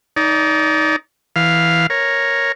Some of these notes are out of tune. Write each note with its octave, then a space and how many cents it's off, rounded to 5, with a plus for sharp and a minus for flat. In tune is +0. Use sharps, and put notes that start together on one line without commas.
D#4 +10 D5 -25
E3 +0 F5 +0
A#4 +0 C#5 -5